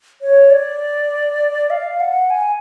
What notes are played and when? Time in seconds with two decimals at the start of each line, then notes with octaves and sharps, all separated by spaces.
0.21 C#5
0.50 D5
1.70 F5
2.00 F#5
2.30 G#5